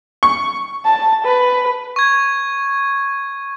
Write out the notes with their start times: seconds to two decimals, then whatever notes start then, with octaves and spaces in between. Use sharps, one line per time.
0.23 C#6
0.86 A5
1.25 B4
1.96 C#6 G#6